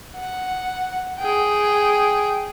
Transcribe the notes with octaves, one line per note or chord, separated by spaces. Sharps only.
F#5
G#4 G5